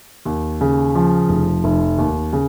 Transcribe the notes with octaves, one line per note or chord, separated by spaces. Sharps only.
D#2
C#3
F3
F1
F1
D#2
C#3